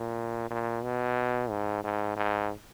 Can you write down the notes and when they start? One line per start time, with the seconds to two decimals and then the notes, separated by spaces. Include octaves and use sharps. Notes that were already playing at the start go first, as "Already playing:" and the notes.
Already playing: A#2
0.51 A#2
0.83 B2
1.50 G#2
1.84 G#2
2.16 G#2